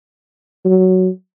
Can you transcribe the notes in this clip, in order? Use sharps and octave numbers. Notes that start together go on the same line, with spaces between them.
F#3